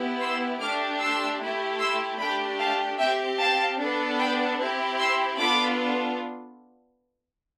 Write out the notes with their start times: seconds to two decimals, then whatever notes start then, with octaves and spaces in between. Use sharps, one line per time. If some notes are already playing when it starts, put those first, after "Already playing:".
Already playing: B3 E4 G4
0.21 C6 E6
0.60 A3 D4 G4 D6 F6
1.00 C6 E6
1.41 A3 E4 G4
1.80 C6 E6
2.19 A3 D4 G4 G5 B5
2.59 F5 A5
2.99 C4 G4 E5 G5
3.40 F5 A5
3.79 B3 D4 A4
4.18 G5 B5
4.59 C4 E4 G4
4.98 C6 E6
5.38 B3 D4 F4 A4 B5 D6